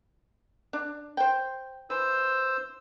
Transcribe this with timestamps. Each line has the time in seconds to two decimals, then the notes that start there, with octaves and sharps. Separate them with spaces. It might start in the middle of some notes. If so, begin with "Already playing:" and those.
0.73 D4
1.17 C5 G5
1.90 E3 C5 E6